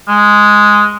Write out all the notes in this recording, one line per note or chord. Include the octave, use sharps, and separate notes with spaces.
G#3